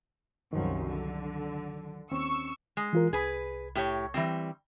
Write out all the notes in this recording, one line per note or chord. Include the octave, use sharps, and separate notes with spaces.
C2 F#2 D#3 F3 F#3
D3
D#2 C4 C#4 C#6 E6
G#3
E3 F4 A#4
C2 G#4 B4
A2 G4 C#5
E3 G3 C4